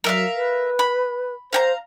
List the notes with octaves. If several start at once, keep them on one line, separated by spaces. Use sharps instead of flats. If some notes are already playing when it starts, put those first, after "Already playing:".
F#3 A#4 E5 F5
B4
B5
C5 F5 G5 A#5